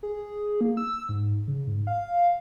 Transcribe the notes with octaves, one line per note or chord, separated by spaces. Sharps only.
G#4
A#3
E6
G#2
C#3
G#2
F5